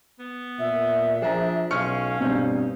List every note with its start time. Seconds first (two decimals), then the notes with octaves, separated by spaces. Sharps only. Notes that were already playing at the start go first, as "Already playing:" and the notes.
0.19 B3
0.59 A#2 E5
1.22 F3 D4 G#4 A#5
1.71 B1 C#4 F5 C#6 F6 C#7
2.20 G2 B2 C4 D#4